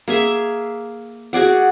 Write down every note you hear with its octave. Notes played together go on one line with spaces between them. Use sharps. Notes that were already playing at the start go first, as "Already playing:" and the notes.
A#3 G#4 E5
F#4 G#4 D5 F#5